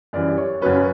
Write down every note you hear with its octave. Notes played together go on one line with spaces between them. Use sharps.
F#2 E3 G3 D5
C#5
F#2 C#3 F#3 C#4 B4